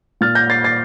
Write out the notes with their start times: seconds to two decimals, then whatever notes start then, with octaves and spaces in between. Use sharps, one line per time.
0.21 A#2 F6 A6
0.35 G6 A#6
0.50 A6 C7
0.64 A6 C7